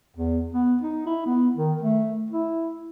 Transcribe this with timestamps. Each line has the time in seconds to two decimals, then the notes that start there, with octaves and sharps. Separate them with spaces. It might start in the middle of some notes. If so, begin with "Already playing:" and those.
0.16 E2
0.52 B3
0.81 D#4
1.07 E4
1.26 B3
1.56 D#3
1.82 A3
2.30 E4